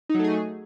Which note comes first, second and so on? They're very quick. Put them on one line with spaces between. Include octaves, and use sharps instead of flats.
D#4 F#3 A3 G#4